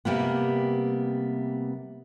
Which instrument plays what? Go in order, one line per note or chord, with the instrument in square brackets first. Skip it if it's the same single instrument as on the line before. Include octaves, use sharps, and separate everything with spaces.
[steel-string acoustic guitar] C3 G3 A#3 B3